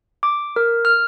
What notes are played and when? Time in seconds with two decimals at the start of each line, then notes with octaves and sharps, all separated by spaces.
0.23 D6
0.56 A#4
0.85 F6